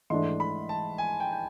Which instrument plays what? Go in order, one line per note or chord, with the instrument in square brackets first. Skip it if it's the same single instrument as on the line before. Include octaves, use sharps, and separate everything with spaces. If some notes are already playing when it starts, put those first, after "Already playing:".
[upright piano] G#2 E3 A3 D4 [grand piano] C6
[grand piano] B5
A5
G#5
G5
G5